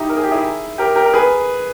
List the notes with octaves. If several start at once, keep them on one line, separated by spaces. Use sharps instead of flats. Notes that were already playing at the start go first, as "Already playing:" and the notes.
Already playing: D#4 E4 G4
A#4
G#4
G4
E4 G#4
G4 A#4
G4 A#4
A#4
G#4 B4